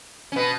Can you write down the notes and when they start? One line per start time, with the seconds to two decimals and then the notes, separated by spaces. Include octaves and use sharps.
0.32 C#4
0.36 B2 B3